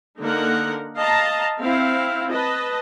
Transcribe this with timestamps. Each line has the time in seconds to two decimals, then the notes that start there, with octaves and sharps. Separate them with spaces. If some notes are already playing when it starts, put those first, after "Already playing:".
0.20 D3 A#3 D#4 A#4 F#5
0.97 D#5 F5 A5 A#5
1.59 C4 E4 F5
2.30 B4 D#5 A5